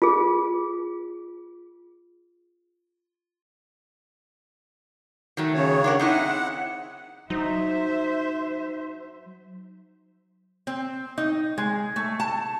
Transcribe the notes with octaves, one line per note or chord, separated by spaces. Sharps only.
F4 G#4
D#3 F#3 A3
C#3 C#5
D4 A#4 F#5
C4 D#4 E4 F#5
F#3 D#4 C5 E5
C4
D#4
G#3
A3
A5